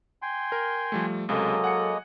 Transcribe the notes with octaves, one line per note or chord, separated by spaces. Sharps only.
G5 G#5 C6
A#4
F3 G3 A3
C#2 C3 F#3 G#3 A#3 A4 D#5
F#5 G#5 C#7